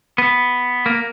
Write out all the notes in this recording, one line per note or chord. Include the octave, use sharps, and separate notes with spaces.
B3
A#3